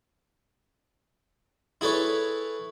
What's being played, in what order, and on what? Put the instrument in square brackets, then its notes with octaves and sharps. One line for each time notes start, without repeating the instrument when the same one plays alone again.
[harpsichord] E4 G#4 A4 B4 C#5